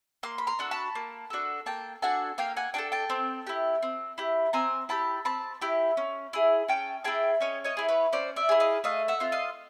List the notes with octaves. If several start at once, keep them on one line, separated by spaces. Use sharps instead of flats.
A#3 C6 D6
B5
A#5 C6
D4 F#4 A4
A5 B5
A#3
D4 F#4 A4
A#3 G5 A5
D4 F#4 A4 F#5 G#5
A#3 F5 G5
F#5 G#5
D4 F#4 A4 G5 A5
G5 A5
C4
E4 G4
C4
E4 G4
C4 G#5 A#5
E4 G4 A5 B5
C4 A5 B5
E4 G4
C#4
E4 G#4
C#4 G5 A5
E4 G#4 G5 A5
C#4 C#5 D#5
C#5 D#5
E4 G#4
B4 C#5
C#4 C5 D5
D5 E5
E4 G#4
D#5 F5
A3 D#5 F5
E5 F#5
C4 F4
D#5 F5